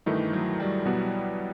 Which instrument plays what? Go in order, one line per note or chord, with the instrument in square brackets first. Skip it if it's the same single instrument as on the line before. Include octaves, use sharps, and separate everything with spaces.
[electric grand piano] G2 D#3 A3 D#4 [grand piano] E3
[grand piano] F#3
G3
[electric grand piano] B2 G3 B3 [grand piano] F#3